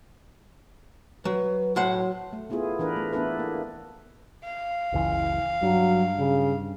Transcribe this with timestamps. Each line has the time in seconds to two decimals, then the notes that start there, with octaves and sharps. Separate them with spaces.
1.25 F#3 B4
1.76 A2 F#3 C5 F#5
2.33 A3
2.50 A3 B3 E4 F4 G#4
2.79 E3 D4 A#4 B4
2.96 A3
3.13 B3 D4 E4 A4 B4
3.39 A#3
4.44 F5
4.92 F#1 C#2 E3
5.63 G2 F#3
6.19 C#3